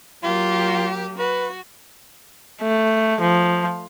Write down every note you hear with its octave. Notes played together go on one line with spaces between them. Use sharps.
F#3 A#3 F4 G4
F#4 B4
A3
F3